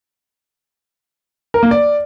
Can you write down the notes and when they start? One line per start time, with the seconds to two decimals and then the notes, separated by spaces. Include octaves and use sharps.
1.54 A#4
1.63 A#3
1.71 D5